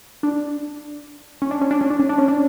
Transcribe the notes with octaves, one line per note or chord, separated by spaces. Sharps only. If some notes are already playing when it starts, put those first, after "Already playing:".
D4
C#4
D4
C#4
D4
C#4
D4
C#4
D4
C#4
D4